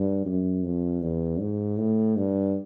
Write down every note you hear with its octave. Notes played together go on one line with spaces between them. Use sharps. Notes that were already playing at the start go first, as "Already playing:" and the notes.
Already playing: G2
F#2
F2
E2
G#2
A2
G2